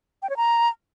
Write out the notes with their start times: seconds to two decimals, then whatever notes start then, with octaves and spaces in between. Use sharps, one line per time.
0.22 G5
0.30 C#5
0.37 A#5